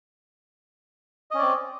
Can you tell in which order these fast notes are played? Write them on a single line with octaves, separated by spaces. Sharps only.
D#5 C#4 D5 C4